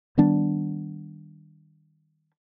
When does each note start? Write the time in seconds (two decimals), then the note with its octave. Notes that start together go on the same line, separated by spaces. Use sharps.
0.18 D#3 G3 B3 D4